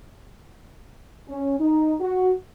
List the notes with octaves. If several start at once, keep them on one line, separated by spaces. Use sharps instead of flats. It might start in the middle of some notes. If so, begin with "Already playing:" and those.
C#4
D#4
F#4